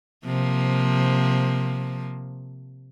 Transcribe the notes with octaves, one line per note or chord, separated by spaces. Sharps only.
C3 F3 A#3